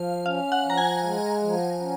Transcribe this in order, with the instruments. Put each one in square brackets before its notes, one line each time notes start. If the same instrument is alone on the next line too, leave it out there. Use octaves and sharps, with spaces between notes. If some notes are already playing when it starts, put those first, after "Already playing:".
Already playing: [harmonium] F3 [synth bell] F5
[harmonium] C#4 [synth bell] F5
[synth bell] F#5
[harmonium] F3 [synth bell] A#5
[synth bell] G#5
[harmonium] G#3
F3
C#4